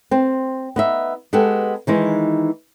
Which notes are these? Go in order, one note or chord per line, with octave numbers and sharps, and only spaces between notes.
C4 C5
B3 D#4 E5
G#3 B3 G4 A4 F#5
D#3 E3 G#3 D#4